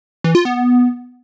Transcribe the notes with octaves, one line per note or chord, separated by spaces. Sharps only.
E3
F4
B3